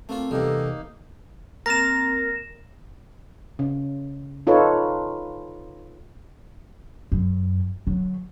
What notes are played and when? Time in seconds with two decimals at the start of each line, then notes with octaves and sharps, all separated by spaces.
0.09 A3 A#3 C4 F4
0.31 E2 C3 G3 A#3 D#4 A4
1.66 A#3 C4 A#4 F6 A6 A#6 E7
3.59 C#3
4.47 D#4 F4 A4 B4 C#5
7.12 F#2
7.87 D3 F#3